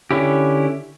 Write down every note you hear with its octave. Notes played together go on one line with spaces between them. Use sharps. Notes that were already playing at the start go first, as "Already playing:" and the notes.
D3 C#4 E4 G4